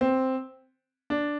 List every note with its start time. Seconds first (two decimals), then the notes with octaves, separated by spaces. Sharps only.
0.01 C4
1.10 D4